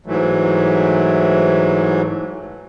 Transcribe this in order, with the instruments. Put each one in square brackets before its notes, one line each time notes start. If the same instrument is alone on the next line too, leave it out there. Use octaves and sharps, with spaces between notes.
[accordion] G#2 E3 F#3 A3